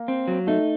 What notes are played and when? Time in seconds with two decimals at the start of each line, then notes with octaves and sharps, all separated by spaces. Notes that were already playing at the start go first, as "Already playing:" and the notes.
Already playing: A#3
0.08 C4
0.28 F#3
0.47 A3 D#4